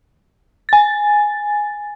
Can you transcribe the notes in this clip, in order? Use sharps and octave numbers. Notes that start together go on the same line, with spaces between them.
G#5 A6